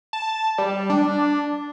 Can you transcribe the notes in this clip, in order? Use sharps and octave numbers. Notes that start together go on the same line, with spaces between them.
A5
G3
D4